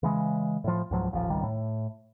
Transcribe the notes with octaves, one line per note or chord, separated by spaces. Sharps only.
C#3 E3 G#3
A2 F3
C#2 G#2 F3 F#3
D#1 A1 F3
G#1 C#2 D#3 G3
A2